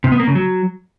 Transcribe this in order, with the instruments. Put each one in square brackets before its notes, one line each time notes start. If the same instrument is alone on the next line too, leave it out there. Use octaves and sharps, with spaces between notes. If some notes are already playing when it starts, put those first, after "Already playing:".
[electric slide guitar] C3
B3
A#3
C#3
F#3